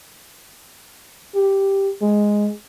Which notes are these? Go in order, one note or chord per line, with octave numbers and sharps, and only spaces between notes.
G4
G#3